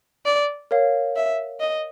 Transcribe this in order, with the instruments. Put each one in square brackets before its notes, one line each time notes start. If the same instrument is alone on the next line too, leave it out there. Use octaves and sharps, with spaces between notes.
[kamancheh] D5
[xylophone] A#4 C#5 F5
[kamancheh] E5
D#5